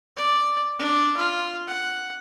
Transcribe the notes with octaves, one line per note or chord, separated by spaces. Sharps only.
D5
D4
F4
F#5